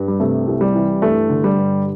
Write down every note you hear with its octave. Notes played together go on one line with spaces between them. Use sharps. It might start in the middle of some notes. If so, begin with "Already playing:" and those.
Already playing: G2
G3
C3 A3
C2
G3
E3
G2 A3
D3
G3
G2